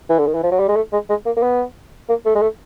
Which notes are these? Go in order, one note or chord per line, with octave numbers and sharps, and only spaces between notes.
E3
D3
D#3
E3
F3
F#3
G3
G#3
A3
G#3
G#3
A#3
A#3
B3
A#3
A3
G#3
A3